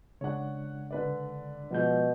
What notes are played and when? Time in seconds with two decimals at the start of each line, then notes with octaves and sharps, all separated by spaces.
0.21 C#3 G#3 D4 C#5 F#5
0.91 D3 B4 D5
1.71 B2 F3 G#3 G6